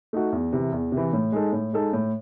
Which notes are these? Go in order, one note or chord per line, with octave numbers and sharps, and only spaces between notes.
A3 D#4 F#4
E2
C3 E3
E2
C3 E3
A2
G#3 D#4 A4
A2
G#3 D#4 A4
A2